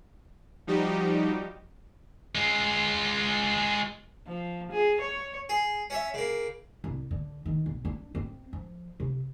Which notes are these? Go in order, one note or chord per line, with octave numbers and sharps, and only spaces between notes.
F3 G3 D#4 F#4 G4
G#3 F4
F3
G#4
C#5
G#4
C#4 C#5 E5
C#3 A#3
C2
D3
D#3
B1
D4
C4
F3
C3